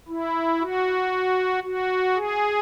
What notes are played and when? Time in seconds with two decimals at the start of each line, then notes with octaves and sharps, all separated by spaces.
0.08 E4
0.61 F#4
1.64 F#4
2.15 G#4